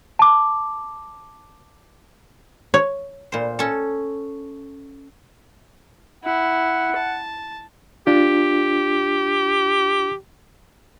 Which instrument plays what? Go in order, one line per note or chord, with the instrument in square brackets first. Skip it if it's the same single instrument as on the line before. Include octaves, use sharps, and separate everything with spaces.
[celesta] A5 D6
[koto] C#5
[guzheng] A#2 C5
C#4 A4
[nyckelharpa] E4 [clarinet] F#5
[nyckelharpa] A5
[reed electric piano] D4 F4 [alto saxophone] G4